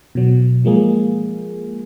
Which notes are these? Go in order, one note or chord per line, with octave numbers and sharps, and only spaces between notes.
B2 F#3
F3 G#3 A#3 G#4